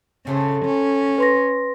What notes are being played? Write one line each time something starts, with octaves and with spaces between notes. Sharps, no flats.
A2 C#3 A3 C5
C#4
B4 C6 A#6